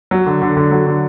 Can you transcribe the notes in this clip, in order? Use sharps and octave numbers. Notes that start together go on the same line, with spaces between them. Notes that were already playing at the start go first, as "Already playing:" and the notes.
F#3
D3
D3
D3
F#3
D3